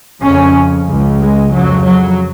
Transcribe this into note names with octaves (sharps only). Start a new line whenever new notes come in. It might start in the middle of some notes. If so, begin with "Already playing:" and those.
F2 C#3 C#4
C#2 C#3
G#3
F2 C#3 F#3
F#3